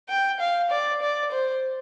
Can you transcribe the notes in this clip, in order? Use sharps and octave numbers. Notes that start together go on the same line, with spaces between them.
G5
F5
D5
D5
C5